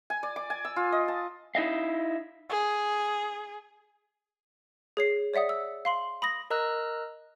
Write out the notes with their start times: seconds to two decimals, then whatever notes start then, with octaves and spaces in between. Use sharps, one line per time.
0.10 G#5
0.23 D5
0.36 D6
0.50 G#5
0.65 E6
0.76 F4
0.92 D#5
1.08 A5
1.55 D#4 E4 D#5 F5
2.50 G#4
4.97 G#4 C#5 C7
5.34 C#5 D5 E5 F#5 D#6
5.49 E6
5.85 F5 C6 F#7
6.22 B5 D#6 A#6
6.50 A#4 D#5 A#5 E6 F#6